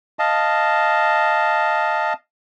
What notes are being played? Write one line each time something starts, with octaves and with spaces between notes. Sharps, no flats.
D#5 F5 A5